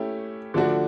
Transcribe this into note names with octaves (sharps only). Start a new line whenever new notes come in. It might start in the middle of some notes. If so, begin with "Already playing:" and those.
Already playing: A3 C#4 E4 G4
D3 F3 A3 D4 F#4